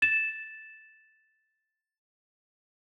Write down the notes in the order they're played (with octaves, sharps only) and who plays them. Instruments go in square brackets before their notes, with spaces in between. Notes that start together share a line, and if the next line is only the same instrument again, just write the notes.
[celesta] A6 E7